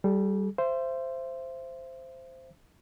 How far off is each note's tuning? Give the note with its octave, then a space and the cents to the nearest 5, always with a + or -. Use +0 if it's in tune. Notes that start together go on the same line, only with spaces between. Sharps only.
G3 -10 A4 -45
C5 +0 E5 +35